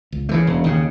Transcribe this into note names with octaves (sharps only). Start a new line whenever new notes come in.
C#2
C#3 E3 A3
E1
D#2 C#3